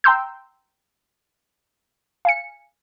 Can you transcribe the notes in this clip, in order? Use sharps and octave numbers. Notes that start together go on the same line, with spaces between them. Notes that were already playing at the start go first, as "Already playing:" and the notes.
G5 A#5 C6 E6 G6
F5 G#5 C#7